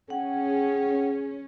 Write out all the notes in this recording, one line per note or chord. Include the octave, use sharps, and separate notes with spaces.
C#4 G#4 F#5 G5